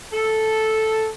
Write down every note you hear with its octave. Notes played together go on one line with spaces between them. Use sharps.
A4